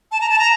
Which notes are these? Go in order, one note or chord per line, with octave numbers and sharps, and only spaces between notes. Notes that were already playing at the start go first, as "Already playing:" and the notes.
A5
A#5
A5
A#5